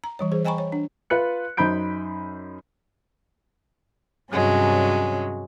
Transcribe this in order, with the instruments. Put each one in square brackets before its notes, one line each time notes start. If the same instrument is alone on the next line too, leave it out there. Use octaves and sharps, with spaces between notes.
[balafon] A#5
E3 G3 C#5
E3 G#4 C5
D#5 G5 G#5 A#5 B5 C#6
C#5
D4
[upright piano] F4 B4 F#6 C#7
F#2 D#4 C5 B5 G6 D7
[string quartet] G2 C3 F#3 G#3 C#4